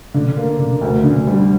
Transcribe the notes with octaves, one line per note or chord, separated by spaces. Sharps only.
D3
A#3
D3
D2
D3
G3